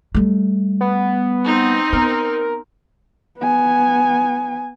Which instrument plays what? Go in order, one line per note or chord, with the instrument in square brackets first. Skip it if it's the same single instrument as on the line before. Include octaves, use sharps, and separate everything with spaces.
[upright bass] G3 A3
[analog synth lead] B3
[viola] C4 D#4
[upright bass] B3 [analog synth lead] A#4
[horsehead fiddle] B3 G#5